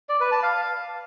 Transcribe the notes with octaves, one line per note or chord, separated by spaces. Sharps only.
D5
B4
A5
F5